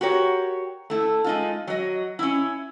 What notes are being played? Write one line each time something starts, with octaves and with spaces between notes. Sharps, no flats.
F#4 G4 A#4 C#5
A3 E4
G#3 D#4 F4
F#3 D#5
C#4 E4